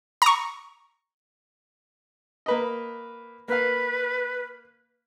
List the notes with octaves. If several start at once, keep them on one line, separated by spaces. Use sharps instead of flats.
A#5 C#6
A#3 B4 D#5
A#3 B4 F5